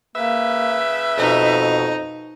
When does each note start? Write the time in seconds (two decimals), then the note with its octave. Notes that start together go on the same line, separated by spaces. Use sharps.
0.16 C#3 A#3 B4 E5
1.18 F2 B2 D#4